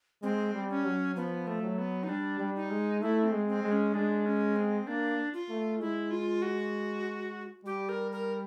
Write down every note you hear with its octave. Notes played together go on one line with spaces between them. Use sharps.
G#3 C4
G3
C#4
F#3
F3 B3
A3
F#3
B3
D#4
G3 D4
G3
D#4
G#3
A3 E4
C4
G#3
C4
G#3
C#4
G#3 D4
C#4
C4
A#3 D4
F4
A3
G#3 E4
F4
F#4
G3 G4
A#4
A#4